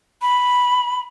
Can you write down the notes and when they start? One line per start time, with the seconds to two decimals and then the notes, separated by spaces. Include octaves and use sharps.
0.22 B5